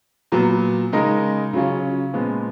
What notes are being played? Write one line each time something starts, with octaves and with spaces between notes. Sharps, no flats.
A#2 F#3 B3
C#3 G#3 D#4 A#4
C#3 F#3 C#4 F4
A#2 F3 G#3 B3